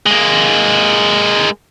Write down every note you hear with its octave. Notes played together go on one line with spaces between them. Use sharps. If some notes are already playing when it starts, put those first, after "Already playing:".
G#3 A#3